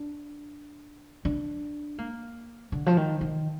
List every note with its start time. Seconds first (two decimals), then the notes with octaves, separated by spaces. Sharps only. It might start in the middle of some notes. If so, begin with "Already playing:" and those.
Already playing: D4
1.25 D4
1.98 A#3
2.72 D3
2.86 F3
2.97 D#3
3.21 D#3